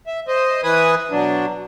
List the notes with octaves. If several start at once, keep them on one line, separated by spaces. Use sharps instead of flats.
E5
C5 D#5
E3 B4 G#5 D#6
B2 F#3 D4